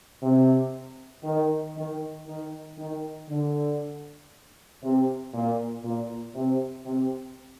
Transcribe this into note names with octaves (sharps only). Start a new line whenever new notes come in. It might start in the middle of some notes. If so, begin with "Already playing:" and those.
C3
D#3
D#3
D#3
D#3
D3
C3
A#2
A#2
C3
C3